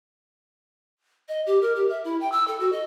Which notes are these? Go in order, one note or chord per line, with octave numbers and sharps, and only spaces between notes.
D#5
G4
A#4
G4
E5
E4
G5
E6
A4
F#4
D#5